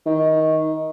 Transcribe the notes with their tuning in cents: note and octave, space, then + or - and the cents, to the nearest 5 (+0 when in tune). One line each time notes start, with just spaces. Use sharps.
D#3 +15